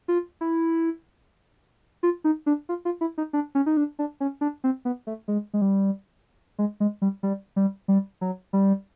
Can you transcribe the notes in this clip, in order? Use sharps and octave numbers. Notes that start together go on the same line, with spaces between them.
F4
E4
F4
D#4
D4
F4
F4
E4
D#4
D4
C#4
D#4
D4
D4
C#4
D4
C4
B3
A3
G#3
G#3
G3
G#3
G#3
G3
G3
G3
G3
F#3
G3